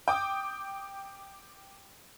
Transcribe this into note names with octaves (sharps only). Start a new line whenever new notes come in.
G5 D6 D#6